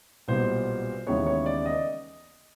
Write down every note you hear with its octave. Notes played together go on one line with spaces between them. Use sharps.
B1 A#2 G3 B3 C5
D#2 C#3 E3 G#3 B3 C#5
C#5
D5
D#5